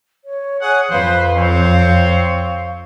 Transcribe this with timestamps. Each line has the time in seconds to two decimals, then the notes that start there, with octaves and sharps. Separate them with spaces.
0.25 C#5
0.62 G#4 C#5 F#5
0.91 F2 B4 C5 F5
1.35 C4 C5 C#5